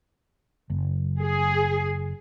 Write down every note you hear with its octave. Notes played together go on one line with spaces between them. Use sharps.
F#1
G#4